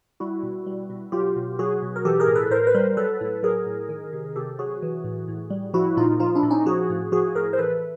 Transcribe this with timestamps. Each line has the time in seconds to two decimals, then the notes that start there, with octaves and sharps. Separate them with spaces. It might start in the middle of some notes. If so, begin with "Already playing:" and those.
0.20 G3 E4 F#4
0.43 B2
0.66 G3
0.90 B2
1.12 F#3 F4 G4
1.36 B2
1.59 F#3 F#4 G#4
1.82 B2
1.96 A#4
2.05 E3 G4 A4
2.20 G#4 A#4
2.27 A2
2.35 A4 B4
2.51 A2 A#4 C5
2.67 B4
2.74 G3 A#4 C5
2.97 F#3 A4 B4
3.21 A2
3.43 F#3 G#4 A#4
3.66 A2
3.89 D#3
4.13 C3
4.36 C3 G4 A4
4.59 F#3 F#4 G#4
4.82 E3
5.04 A2
5.28 A2
5.50 G3
5.74 F3 E4 F#4
5.97 A#2 D#4 F4
6.20 F3 D#4 F4
6.35 D4 E4
6.43 A#2
6.51 C#4 D#4
6.66 F3 F#4 G#4
6.90 A2
7.12 F3 F#4 G#4
7.35 A2 G#4 A#4
7.53 C5
7.58 E3 A4 B4